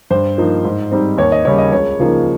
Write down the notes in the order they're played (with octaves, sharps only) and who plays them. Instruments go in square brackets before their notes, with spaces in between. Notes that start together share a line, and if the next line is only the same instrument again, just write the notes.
[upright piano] G2 C5
F3 A#3 D#4
G#2
G3 C4 D#4
D#2 C#5
D#5
C#3 G3 A#3 C#5
D#5
C#2 C#5
C#3 F3 A#3 D#4